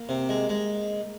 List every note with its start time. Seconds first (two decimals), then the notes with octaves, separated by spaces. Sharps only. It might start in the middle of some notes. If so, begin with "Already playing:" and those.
Already playing: A#3
0.09 C3
0.29 G#3
0.49 G#3